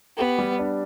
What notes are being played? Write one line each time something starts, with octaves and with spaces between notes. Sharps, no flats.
B3 G4
G3
D4